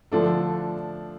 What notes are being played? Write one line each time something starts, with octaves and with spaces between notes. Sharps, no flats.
D3 F3 A3 D4 A4